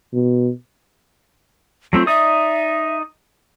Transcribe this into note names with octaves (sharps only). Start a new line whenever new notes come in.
B2
F#3 A3 C4 F4
D#4 D5 E5 D#6